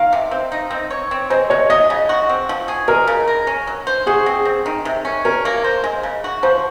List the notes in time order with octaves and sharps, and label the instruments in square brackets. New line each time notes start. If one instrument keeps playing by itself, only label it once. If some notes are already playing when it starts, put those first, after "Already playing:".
Already playing: [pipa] D#3 [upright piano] F5
[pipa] C3
C4
D#4
C4
C#5
C4
[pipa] G#3 [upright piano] C5
[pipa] G#3 [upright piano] C#5
[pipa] F#3 [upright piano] D#5
[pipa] C#3
F#4
C4
F3
G#4
[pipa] G#3 [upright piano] A#4
[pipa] C#3
A#4
C#4
F#3
C5
[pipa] F#4 [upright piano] G#4
[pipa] C4
C4
D#3
C3
C#4
[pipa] C#4 [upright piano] A#4
[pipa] A#3
C5
G#3
C#3
F#4
[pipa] F3 [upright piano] C5